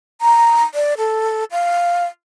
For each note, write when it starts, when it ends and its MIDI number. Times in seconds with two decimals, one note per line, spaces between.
0.21 0.63 82
0.74 0.94 74
0.98 1.44 69
1.51 2.05 77